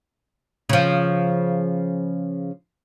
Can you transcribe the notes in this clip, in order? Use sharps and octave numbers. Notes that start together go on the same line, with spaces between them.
C#3 F3